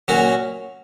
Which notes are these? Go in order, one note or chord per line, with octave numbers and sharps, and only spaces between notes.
A#2 F#3 C#4 F#4